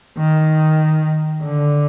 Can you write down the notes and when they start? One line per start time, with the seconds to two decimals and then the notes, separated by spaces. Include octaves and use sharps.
0.18 D#3
1.43 D3